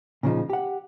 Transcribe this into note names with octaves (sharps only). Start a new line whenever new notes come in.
A#2 C#3 F3 D#4
G4 F#5